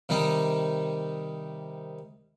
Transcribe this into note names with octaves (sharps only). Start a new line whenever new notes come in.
C3 D#3 G3 D#4